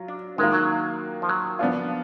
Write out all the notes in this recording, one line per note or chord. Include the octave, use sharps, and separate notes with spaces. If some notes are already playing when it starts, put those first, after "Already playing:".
Already playing: F#3 F4
D4
D#3 G#3 A#3 F4
F#3
F3
F#3
F3 B3 D4 F4